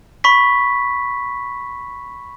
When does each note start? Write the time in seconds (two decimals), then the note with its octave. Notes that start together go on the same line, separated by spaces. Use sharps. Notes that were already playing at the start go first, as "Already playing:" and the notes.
0.24 B5 C#6 B6